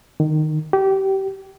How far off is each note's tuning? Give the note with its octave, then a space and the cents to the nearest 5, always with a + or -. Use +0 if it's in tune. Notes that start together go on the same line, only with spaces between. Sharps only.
D#3 -15
G4 -25